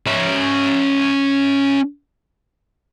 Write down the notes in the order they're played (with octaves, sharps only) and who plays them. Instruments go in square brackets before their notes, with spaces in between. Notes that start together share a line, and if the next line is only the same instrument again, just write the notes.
[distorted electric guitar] C#4 E5